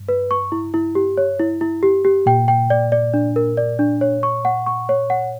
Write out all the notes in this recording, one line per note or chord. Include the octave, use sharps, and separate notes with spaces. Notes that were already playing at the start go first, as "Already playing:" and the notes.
Already playing: G2
B4
C#6
E4
E4
G4
C#5
E4
E4
G4
G4
A#2 G5
G5
D5
D5
D4
A#4
D5
D4
C#5
C#6
F#5
C#6
C#5
F#5